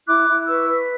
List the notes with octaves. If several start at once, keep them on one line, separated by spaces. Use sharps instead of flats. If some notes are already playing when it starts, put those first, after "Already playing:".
E4 D6 F#6
E4
B4 C#6 E6
B4